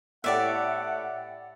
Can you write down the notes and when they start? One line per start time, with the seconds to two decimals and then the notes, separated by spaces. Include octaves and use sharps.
0.24 A2 G4 D5 E5 F#5